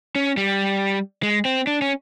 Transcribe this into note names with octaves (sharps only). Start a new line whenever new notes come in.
C#4
G3
G#3
C4
D4
C#4